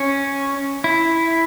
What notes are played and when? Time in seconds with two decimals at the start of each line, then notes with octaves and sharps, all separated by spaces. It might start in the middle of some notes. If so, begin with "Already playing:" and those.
Already playing: C#4
0.84 E4